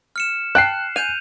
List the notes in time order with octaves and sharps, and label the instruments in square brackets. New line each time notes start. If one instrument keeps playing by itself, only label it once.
[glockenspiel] F6 C#7 E7
[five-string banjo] G5 A5 [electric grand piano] F#6 C7
[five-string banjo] G#5 [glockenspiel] G6 D#7 F7